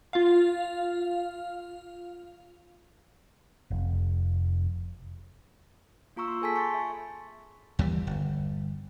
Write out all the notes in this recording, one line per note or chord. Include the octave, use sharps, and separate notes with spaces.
F4 F5
F1
A#3 F4 A#5 C#6 E6
C6
G#4 A4 G#5 A5 C6 B6
B5 C#6 G6 A6
E5
D#2 E3 G3
G1